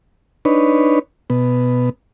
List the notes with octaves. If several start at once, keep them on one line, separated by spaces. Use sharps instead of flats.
D4 D#4 B4 C#5
B2 B3